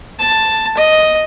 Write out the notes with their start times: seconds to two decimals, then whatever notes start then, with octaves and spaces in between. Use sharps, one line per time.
0.19 A5
0.77 D#5